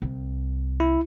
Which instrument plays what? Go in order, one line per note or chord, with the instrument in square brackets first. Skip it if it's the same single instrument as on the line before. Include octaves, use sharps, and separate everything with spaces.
[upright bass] C2
[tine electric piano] E4